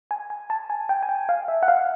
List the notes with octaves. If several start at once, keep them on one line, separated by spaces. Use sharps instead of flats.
G#5
G#5
A5
G#5
G5
G#5
G5
F5
E5
F#5
F5